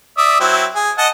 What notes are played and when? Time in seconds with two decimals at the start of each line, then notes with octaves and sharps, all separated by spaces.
0.18 D5 E5 D#6
0.40 F#3 C4 E4
0.76 G#4
0.98 D#5 F#5 A5